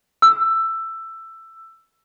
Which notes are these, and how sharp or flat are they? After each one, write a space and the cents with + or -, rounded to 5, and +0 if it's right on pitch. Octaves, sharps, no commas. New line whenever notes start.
E6 +10